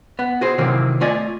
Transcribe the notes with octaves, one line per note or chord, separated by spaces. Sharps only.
B3
F#4 G#4 C5
C3 D#3 E3 F#3 A#3 C4
A3 F4 D5 D#5 G#5